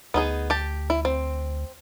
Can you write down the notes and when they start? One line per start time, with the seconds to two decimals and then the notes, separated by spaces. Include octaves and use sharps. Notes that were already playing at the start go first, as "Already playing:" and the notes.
0.14 D2 B3 D#4 G#4
0.50 G4 A5
0.90 E4
1.05 C4